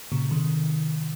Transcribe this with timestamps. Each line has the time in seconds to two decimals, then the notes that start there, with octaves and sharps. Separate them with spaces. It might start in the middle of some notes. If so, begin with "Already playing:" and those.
0.12 A#2 C#3
0.31 C3 D#3